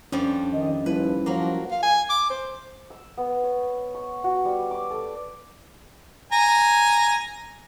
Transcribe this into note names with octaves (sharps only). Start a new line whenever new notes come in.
F2 F3 G3 C#4 D4
D#3 D#5
D#2 F3 G3 C#4 E4 B4
F3 F#3 A#3
F5
G#5
D6
C5
E6
B3
C#5
C#6
F#4
G3
D6
A4
G#5 A#5